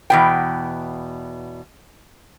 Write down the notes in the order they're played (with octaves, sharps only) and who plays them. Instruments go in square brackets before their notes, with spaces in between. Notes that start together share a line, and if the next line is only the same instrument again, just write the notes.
[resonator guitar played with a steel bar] E2 B2 G5